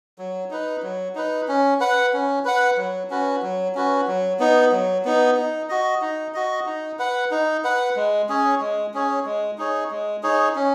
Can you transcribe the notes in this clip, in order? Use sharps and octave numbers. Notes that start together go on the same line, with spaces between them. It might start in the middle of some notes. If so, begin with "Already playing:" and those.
F#3
D#4 B4
F#3
D#4 B4
C#4
B4 F#5
C#4
B4 F#5
F#3
C#4 F#4 B4
F#3
C#4 F#4 B4
F#3
B3 D#4
F#3
B3 D#4
D#4
F#4 D#5
D#4
F#4 D#5
D#4
B4 F#5
D#4
B4 F#5
G#3
C#4 G#4 C#5
G#3
C#4 G#4 C#5
G#3
D#4 G#4 C#5
G#3
D#4 G#4 C#5
C#4